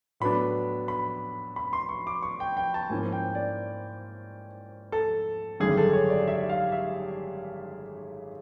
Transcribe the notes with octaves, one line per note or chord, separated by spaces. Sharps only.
A2 F#3 B3 D4 B5
B5
B5
C6
C#6
D6
C#6
G5
G5
A5
G#2 F3 A#3 C#4 E4 G#5
G5
D5
A4
G#1 F#2 D3 G3 G#4
A4
C#5
D5
E5
F5
E5